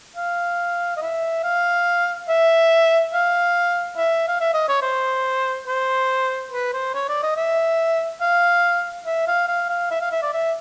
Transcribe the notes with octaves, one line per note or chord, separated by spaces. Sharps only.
F5
D#5
E5
F5
E5
F5
E5
F5
E5
D#5
C#5
C5
C5
B4
C5
C#5
D5
D#5
E5
F5
E5
F5
F5
F5
E5
F5
E5
D5
E5